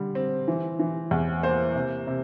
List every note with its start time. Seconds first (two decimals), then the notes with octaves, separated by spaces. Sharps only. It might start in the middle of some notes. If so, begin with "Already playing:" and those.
Already playing: D3 G3
0.15 C4
0.48 E3
0.79 E3
1.11 E2
1.43 A#3 C5
1.75 C3
2.07 C3